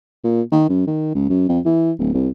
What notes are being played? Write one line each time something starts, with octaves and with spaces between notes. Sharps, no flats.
A#2
D#3
F#2
D#3
C#2
F#2
F2
E3
D1
C2